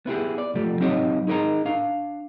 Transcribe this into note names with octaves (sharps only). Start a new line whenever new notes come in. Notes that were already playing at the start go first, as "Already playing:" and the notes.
B3 E4 G4 G#4
D5
F3 A3 G4
F#3 C4 D#4 G4 C#5 D#5
D#4 G#4 A#4 D#5 A#5
D4 F5